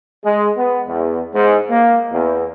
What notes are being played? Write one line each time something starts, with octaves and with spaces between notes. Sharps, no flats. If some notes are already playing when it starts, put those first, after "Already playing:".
G#3
B3
E2
G#2
A#3
E2